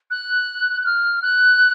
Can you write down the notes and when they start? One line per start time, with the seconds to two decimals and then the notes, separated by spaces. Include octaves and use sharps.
0.11 F#6
0.81 F#6
0.86 F6
1.22 F#6